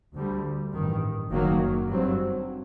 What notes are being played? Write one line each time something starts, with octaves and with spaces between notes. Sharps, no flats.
D2 D3 G3
A1 G2 D#3
F#1 F#2 D#3 F#3 A#3
G2 F#3 C4